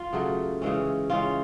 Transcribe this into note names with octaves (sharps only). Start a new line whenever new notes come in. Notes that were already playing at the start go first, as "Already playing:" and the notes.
Already playing: F4
C#3 F#3 A3
C#3 E3 G#3 C#4
C#3 E3 G#3 C#4 F4